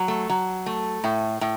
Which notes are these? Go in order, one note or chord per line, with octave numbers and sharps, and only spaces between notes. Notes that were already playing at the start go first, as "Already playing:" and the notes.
Already playing: F#3
A3
F#3
A3
A2
A2